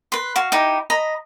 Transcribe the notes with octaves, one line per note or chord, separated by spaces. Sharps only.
B4 C6
F#4 F5
D#4 E4 G4
D#5 A#5 B5